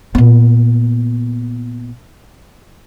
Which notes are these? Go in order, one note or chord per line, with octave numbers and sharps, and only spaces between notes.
A#2 B3